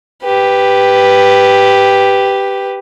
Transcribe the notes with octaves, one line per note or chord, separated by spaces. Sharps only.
G4 B4